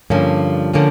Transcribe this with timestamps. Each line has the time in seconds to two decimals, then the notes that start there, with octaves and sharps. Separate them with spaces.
0.10 G2 D3 F3 A#3 C#4
0.74 D3 F3 A#3 C#4